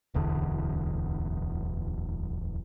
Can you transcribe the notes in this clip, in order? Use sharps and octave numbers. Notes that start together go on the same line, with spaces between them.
D1 B1 E2 D3